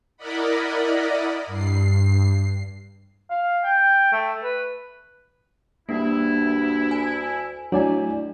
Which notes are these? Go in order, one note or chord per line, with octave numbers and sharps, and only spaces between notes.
E4 A#4 D5 D#5 F#5 B5
G2 C7
F5
G5
A3
B4
D2 G2 A#3 E4
G#5
A2 F#3 A3 D4 D5 G#5